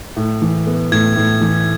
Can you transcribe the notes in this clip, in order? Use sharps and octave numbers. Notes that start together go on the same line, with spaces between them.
A2
E3
B3
A2 G#6
A2
E3